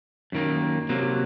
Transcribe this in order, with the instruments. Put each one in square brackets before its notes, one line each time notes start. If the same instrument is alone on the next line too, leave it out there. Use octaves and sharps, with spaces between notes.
[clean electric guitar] F#2 D#3 A#3
C3 F#3 A#3